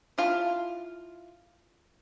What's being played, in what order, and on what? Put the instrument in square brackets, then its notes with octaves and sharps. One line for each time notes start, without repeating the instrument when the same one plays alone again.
[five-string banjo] E4 F4 F5 A5